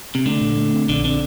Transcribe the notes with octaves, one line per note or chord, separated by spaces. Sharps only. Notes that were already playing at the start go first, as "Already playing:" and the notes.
C3
D3 A3
A#2
A3
C4
A#1 D3
D3 C4